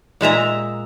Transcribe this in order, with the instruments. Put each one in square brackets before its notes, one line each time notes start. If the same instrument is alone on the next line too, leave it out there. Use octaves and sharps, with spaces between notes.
[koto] A#2 G#3 E5 A#5